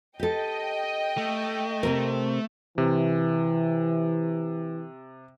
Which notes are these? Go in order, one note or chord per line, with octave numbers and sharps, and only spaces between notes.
G4 A4 D#5 G5
A3
C3 C4 A#4
C3 E3